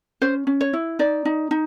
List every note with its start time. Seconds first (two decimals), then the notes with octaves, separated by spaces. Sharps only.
0.22 C#4 C5
0.47 C#4
0.61 C#5
0.73 E4
0.99 D#4 D5
1.25 D#4
1.51 D#4